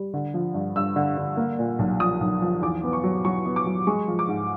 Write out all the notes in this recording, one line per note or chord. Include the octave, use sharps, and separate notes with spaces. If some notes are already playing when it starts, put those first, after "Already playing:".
Already playing: G3
D3
F3
G2
G2 E6
D3
D3
A#3
A#2
B1
F3 D#6
B1
F3
E2 D6
B3
C#6
F#3
F#3 C#6
B3
D6
F#3
G#3 C#6
F3
D6
G#2